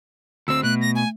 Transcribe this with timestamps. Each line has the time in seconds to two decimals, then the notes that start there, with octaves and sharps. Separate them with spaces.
0.48 D2 C4 E6
0.63 B2 A3 F#6
0.81 A#6
0.95 G#5